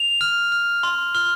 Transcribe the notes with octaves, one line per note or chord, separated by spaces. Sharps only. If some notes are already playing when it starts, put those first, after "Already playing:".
Already playing: F7
F6
F6
C6
F6 G7